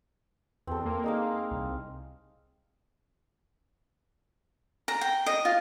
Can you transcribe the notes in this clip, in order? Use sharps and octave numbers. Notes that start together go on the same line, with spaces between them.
E2 C4 A4
A#3
G#3 D#4 F5
C2
A#5
G5
D#5
F4